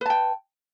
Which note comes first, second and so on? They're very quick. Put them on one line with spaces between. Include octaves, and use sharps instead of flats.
B4 A5 G5